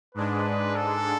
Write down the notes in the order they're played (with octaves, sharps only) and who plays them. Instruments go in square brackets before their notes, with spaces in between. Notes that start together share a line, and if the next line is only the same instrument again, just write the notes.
[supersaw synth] G#2 G#3 D4 [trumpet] B4
[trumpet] A4